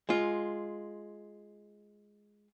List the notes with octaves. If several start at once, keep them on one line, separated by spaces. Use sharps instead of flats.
G#3 F4